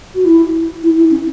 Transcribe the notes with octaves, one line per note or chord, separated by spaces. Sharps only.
F#4
E4
E4
E4
C#4